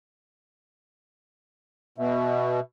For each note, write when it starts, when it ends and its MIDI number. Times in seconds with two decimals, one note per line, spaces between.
1.98 2.60 47
1.98 2.61 76